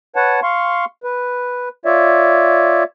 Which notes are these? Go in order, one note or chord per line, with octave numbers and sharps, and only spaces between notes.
B4 C#5 F#5 A5
F5 C6 C#6
B4
F4 C#5 D5 E5